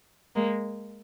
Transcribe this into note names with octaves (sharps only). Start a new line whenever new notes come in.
G#3 A#3